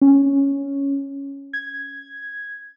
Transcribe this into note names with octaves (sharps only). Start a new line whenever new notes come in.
C#4
G#6